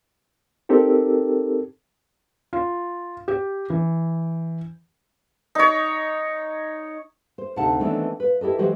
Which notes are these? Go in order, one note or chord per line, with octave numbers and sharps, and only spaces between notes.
C4 D#4 G4 A4 A#4
F4
G4
E3
D#4 C#5
C5
D2 C3 D#4 F5 F#5 A5
D#3 E3 A3 B3 C4 D4
B4 F5
E4 G4 A4 D#5
E3 F#3 G#3 F#4 G4 C5